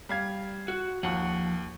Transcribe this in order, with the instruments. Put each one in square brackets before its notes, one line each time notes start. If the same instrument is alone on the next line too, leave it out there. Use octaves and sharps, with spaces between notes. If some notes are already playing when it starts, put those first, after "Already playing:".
[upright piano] G3 F5 G#6
[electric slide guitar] F#4
[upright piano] D#2 [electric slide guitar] F3 F#5